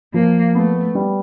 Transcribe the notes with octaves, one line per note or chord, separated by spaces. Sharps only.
F3 A#3
A3 B3
G3